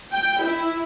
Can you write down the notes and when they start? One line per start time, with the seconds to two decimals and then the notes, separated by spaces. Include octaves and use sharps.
0.13 G5
0.43 E4